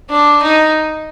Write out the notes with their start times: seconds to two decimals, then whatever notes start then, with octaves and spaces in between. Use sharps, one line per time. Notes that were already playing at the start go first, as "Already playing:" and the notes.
0.10 D4
0.42 D#4